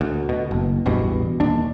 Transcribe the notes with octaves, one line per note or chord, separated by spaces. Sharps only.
D2
B2
F#1
A1 E2 G2 B2
D#1 D#2 D4